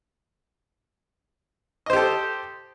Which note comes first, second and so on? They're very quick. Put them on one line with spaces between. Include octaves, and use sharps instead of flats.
D#5 C5 G4 A4